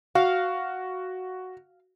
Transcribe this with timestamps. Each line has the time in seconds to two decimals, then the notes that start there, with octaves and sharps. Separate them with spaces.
0.15 F#4 F5